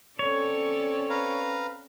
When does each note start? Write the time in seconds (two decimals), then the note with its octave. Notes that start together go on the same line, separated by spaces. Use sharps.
0.19 C4 C#4 A4 C#5 D5
1.10 B4 F5 A#5